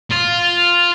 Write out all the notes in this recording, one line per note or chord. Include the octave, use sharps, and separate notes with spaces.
F4